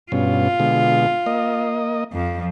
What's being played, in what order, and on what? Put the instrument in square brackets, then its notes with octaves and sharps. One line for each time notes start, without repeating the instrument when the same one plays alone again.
[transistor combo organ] G2 B2 C#4 [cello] F4
[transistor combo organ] B2 D3 G#3
A#3 D#5
[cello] F2 F3